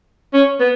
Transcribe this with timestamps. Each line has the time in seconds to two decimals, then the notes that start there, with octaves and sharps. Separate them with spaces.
0.34 C#4
0.60 B3